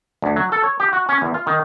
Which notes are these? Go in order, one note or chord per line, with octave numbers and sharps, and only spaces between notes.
D2
F#3
A4
C#5
G4
F#4
C#4
E2
F4
D#3